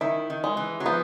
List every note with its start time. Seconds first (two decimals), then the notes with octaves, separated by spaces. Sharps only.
0.01 D#3 E4
0.30 D#3
0.44 G#3
0.57 E3
0.80 F#3
0.86 F3 B3